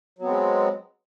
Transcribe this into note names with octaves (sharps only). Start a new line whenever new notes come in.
F#3 G#3 B3 C4